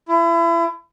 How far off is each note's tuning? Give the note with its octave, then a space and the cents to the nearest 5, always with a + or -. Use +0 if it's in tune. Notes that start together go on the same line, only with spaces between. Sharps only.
E4 +35